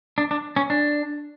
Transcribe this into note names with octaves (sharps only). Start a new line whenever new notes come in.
D4
D4
C#4
D4